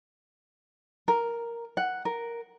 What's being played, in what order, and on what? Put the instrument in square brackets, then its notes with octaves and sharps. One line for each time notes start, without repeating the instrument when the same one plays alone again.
[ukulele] A#4
F#5
A#4